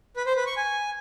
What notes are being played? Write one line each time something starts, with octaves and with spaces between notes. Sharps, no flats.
B4
C5
B4
C#6
G#5